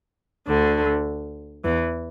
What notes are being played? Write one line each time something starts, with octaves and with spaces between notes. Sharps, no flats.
D2 D3
E2 E3